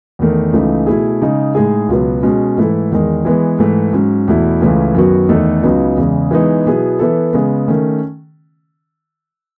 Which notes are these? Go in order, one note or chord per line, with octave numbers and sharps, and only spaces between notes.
E2 D#3 A3
C#2 C#3 E3 A3 D#4
B2 A3 E4 G#4
C#3 G#3 D#4
A2 G#3 D#4 G#4
C#2 B2 F#3 B3
B2 G#3 C#4
G#2 E3 A3 E4 A4
E2 D#3 G#3
E3 G#3 B3
G#2 E3 A3
G#2 F#3 C#4
E2 B2 A3 E4
C#2 C#3 E3 A3 C#4
F#2 D#3 F#3 B3 F#4
E2 D#3 A3 D#4 A4
C#2 C#3 F#3 B3 D#4
E2 C#3 G#3
E3 G#3 B3 D#4
B2 F#3 B3 E4 G#4
E3 B3 E4 A4
C#3 G#3 B3
D#3 A3 C#4